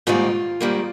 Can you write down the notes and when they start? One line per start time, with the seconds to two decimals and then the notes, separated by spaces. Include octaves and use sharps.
0.07 G#2 D#3 G3 A#3 F4
0.61 G#2 D#3 G3 A#3